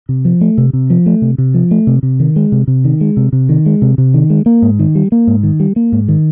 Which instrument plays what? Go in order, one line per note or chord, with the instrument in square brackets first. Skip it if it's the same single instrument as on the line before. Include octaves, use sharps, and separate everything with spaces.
[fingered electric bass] C3
F3
A3
C3
C3
F3
A3
C3
C3
F3
A3
C3
C3
D#3
G#3
C3
C3
D#3
G#3
C3
C3
D#3
G#3
C3
C3
D#3
G#3
A#3
G#2
D#3
G3
A#3
G#2
D#3
G3
A#3
G#2
D#3